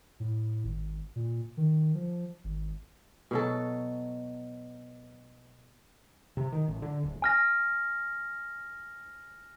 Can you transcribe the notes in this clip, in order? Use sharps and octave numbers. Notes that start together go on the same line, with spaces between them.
A2
G#1
A#2
D#3
F3
G#1
B2 F#3 A4
C3
D#3
A1
D3
D1
G#5 F6 A#6